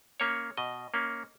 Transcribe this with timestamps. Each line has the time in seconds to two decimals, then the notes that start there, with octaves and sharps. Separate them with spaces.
0.20 A#3 C#4 C#5
0.57 B2 D#5
0.94 A#3 C#4